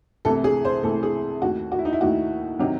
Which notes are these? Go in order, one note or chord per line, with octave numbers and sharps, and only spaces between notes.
C2 C3 E3 A3 A4
G#4
C5
C2 C3 E3 A3 A4
G#4
D#2 D#3 A3 F#4
F#4
E4
D#4
E4
D#2 D#3 A3 F#4
C3 D#3 F#3